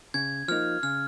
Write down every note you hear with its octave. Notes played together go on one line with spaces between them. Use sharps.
C#3 G#6
F3 A#3 D#4 F6
C#3 F6